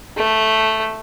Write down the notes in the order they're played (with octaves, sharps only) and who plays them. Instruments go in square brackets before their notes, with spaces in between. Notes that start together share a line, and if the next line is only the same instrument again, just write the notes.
[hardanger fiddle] A3